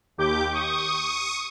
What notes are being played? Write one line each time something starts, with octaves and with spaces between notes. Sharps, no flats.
D#2 G4 D6 G6
C#6 D#6